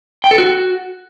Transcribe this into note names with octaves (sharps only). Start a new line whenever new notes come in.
G5
A4
F#4